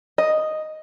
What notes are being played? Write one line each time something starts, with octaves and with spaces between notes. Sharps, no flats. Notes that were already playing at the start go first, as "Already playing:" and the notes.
D#5